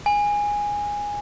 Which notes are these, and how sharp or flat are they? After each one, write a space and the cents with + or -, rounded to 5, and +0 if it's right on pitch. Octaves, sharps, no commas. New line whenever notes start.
G#5 -10